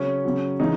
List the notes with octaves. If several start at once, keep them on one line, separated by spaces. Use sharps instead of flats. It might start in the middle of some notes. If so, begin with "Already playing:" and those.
Already playing: C#3 F#3 C#4
C#3 F#3
C#3 E3 D#4